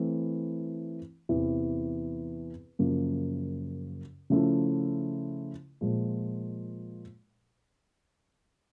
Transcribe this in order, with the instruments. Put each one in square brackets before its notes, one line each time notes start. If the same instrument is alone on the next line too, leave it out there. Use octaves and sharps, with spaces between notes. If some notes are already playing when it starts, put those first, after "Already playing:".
Already playing: [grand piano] E3 A3 C4 E4
E2 C3 E3
F#2 C#3 F3 A#3
C#3 F3 A3 C#4 E4
A#2 F3 G#3